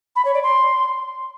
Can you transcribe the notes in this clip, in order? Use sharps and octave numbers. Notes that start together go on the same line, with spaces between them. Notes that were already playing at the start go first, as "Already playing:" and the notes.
B5
C#5
D5
C6